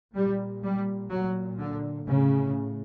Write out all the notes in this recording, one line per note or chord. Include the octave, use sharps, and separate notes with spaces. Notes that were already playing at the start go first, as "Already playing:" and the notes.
A#2 G3
G3
A#2 F#3
D3
A2 C#3